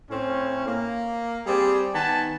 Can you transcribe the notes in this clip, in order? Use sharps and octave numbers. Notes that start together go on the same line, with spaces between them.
A2 C4 C#4
A#3
G3 C4 G#4 D5
D#3 B3 G#5 A5